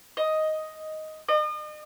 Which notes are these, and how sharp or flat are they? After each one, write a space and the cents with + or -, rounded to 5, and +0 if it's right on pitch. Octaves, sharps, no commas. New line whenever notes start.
D#5 +5
D#5 -40